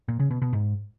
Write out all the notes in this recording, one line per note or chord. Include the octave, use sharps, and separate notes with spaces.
A#2
C#3
B2
B2
G#2